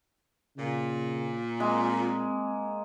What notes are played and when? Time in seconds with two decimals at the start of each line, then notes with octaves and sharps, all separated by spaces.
0.57 A#2 C#3
1.60 G#3 A#3 C4